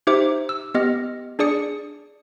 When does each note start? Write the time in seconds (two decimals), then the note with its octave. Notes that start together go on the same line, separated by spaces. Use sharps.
0.07 D#4 G4 C5 E5 D6
0.49 E6
0.74 B3 G4 D#5 F6
1.39 D4 G#4 D5 D#6 C#7